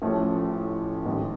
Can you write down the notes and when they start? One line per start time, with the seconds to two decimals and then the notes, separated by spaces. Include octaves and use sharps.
0.02 A1 A2 F3 A3 C#4
1.06 A1 G#2 D#3